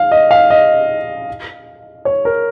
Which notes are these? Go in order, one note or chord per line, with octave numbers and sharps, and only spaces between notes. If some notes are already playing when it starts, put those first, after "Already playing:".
Already playing: F5
D#5
F5
D#5
C#5
A#4